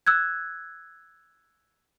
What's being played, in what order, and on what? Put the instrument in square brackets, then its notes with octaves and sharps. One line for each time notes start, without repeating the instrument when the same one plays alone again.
[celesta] E6 F#6 G#6